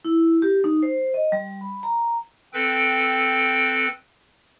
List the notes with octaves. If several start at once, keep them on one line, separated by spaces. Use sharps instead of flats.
E4
G4
D#4
C5
D#5
G3
B5
A#5
C4 A4 B4 G5